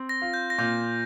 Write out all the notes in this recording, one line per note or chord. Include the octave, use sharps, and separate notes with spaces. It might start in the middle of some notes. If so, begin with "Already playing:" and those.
Already playing: C4
A#6
F4
G6
A#6
A#2 G6